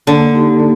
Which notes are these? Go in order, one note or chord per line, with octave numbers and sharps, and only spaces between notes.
D3 A#3
D#4 G4
A#3